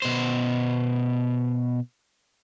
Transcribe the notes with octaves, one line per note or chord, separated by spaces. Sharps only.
B2 C5